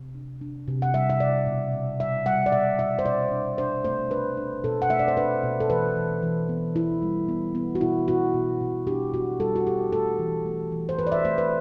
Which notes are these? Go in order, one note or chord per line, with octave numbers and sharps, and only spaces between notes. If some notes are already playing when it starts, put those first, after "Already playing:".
Already playing: C3
D4
D4
C3
F#5
G3 E5
E5
C3 D5
B2
B2
G3 E5
G3 F#5
D5
B2 E5
B2 E5
C5
B2 D5
D4
D4 C5
A3 C5
D4 B4
D4
B2 A4
F#5
A3 E5
D5
C5
D4 B4
B2
A4
E3 B4
E3
E3
B3
E3 E4
G3
B3
B3
F#4
B2 E4
B2 F#4
B2
B2
D4 G4
B2 F#4
G3 A4
F#4
G3 G4
A3 A4
E3
A3
E3
C5
E3 B4
D5
E5
A3 C5
B4